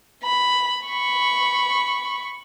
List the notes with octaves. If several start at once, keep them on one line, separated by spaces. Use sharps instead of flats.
B5
B5 C#6